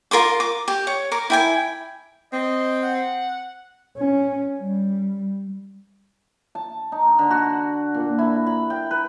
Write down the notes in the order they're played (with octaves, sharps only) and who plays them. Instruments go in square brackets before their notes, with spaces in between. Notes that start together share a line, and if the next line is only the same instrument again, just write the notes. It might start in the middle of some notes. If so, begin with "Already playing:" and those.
[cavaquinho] F4 A#4 C6 D6
D6
G4
C#5
A#4 D6
E4 G5 G#5
[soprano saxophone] C4 [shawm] D#5
[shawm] F#5
[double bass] C#4
G3
[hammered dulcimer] A5
D#4
D3
F#4
A#2
E4
B5
G5
B4